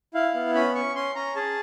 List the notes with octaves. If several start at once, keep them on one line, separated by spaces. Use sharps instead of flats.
E4 F5
B3
C#4 B5
C#4 C#6
C#4 C6
C#4 A#5
G#4 A5